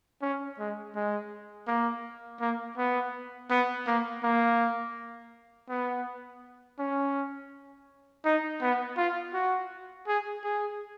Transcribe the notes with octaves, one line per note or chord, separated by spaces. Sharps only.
C#4
G#3
G#3
A#3
A#3
B3
B3
A#3
A#3
B3
C#4
D#4
B3
F4
F#4
G#4
G#4